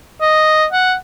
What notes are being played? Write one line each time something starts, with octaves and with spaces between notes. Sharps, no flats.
D#5
F#5